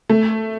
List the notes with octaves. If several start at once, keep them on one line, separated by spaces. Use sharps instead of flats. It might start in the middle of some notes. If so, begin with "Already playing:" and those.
A3